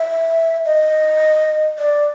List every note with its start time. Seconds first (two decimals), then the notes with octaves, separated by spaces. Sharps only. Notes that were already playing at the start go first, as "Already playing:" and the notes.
Already playing: E5
0.65 D#5
1.79 D5